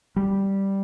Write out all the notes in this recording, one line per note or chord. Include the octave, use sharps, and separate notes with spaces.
G3